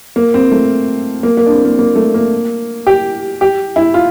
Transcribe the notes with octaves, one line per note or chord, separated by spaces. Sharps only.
A#3
C4
A3
A#3
A#3
D4
C4
A#3
A#3
A3
A#3
G4
G4
E4
F4